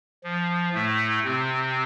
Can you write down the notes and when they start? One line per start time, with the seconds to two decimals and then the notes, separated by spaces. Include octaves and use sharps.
0.24 F3
0.74 A2 A3
1.24 C3 C4